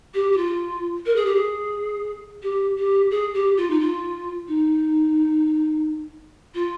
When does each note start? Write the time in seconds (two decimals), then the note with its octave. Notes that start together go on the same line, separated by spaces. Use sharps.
0.14 G4
0.32 G4
0.37 F4
1.05 A#4
1.16 G#4
1.25 G4
1.35 G#4
2.42 G4
2.77 G4
3.11 G#4
3.34 G4
3.57 F4
3.70 D#4
3.80 F4
4.48 D#4
6.54 F4